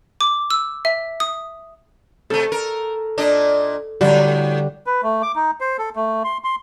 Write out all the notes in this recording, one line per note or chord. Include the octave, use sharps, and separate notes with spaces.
D6
E6
E5
D#6
C3 A3 A4
A#4
A#2 D4 D#5
A2 D3 G3 F#4
B4
A3
D6
D#4
C5
A4
A3
C6
C6